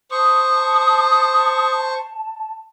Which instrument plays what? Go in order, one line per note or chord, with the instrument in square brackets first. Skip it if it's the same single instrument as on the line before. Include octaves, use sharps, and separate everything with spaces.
[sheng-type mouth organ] C5 C#6 [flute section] A5 [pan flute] D#6